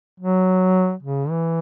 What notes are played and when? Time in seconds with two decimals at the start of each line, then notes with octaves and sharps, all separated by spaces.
0.20 F#3
1.03 C#3
1.29 E3